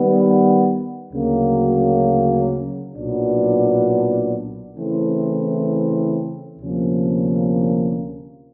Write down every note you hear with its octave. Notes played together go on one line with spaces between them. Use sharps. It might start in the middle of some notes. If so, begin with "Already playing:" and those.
Already playing: D#3 G3 B3
D2 C#3 F#3 A#3
B1 A#2 F#3 B3 D4
C#3 E3 A3 C4 E4
D2 C3 F3 A#3 C#4